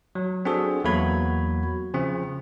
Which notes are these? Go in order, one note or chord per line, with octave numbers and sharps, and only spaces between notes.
F#3
C4 D4 F#4 G#4 A4
E2 F#3 A#3 F#4 B5 G#6
C#3 F3 C4